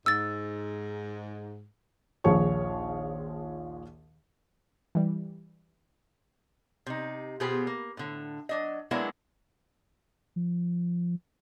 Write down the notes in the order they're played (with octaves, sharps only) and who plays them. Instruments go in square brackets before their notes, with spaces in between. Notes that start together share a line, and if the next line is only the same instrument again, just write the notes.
[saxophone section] G#2 [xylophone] E6 A6
[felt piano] A#1 D#2 F3 G#4 C#5 C#6
[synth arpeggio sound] E3 G3
[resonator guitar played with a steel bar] C3 D#4
B2 B3 F4 G4 G#4 C5
A#3
A2 D3
F#3 D4 D#5
F#3 G#3 A#3 B3 D4 E4
[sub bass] F3